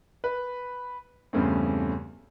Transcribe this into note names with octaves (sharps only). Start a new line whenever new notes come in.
B4
E2 G2 C#3 A3 C4